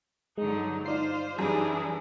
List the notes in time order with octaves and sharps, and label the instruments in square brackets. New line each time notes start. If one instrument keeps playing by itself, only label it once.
[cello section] G2 D3 F#3 [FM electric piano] G#3 [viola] D#4
[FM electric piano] D#4 D5 C7 [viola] F4 [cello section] C5
[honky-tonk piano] F#2 G3 [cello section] E3 D4 [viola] G#4